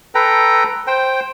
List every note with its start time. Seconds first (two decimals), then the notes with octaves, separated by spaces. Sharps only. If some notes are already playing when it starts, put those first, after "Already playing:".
0.15 A4 B4 G5 A#5
0.87 C5 G5